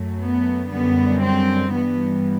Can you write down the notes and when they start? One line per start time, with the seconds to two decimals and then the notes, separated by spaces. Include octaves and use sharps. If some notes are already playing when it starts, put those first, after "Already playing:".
Already playing: F#2 F#3 A3
0.21 B3
0.71 F#2 D3 G3 B3
1.22 C4
1.73 G2 E3 G3 B3